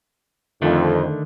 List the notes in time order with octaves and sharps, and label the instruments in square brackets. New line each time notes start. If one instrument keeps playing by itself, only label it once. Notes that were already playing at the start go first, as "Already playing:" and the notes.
[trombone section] F2 [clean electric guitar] D3 D#3 A3